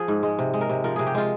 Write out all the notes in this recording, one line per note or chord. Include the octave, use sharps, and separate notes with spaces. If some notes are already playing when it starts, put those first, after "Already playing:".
Already playing: F3 G#4
G#2
G#3
C3
G#3
A#4
C3
F3 A#4
C3 G#4
G4
G#3 F4